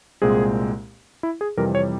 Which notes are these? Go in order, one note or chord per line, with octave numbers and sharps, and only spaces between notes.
C2 A#2 G#3 C4 G#4
E4
G#4
F2 C3 E3 G3 C4 A#4
C#5